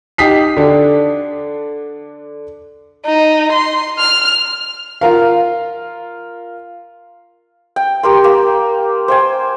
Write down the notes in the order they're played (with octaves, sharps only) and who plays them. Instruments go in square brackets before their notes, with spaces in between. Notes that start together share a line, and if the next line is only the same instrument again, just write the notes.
[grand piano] D#4 G4 D#6 B6 C7
D3 D4
[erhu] D#4
C6
F6
[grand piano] F4 A#4 F5
[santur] G5
G4 A#4 C6
A#3
C5 G5 G#5